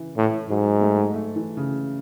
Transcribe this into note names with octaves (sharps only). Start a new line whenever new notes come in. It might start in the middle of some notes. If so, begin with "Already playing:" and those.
Already playing: C#3 E3
A2
G#2 F#3
A3
A3
E3
C#3